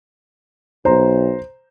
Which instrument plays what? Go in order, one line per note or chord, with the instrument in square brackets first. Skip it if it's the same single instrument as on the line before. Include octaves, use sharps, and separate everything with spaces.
[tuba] B1 [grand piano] C5 A#5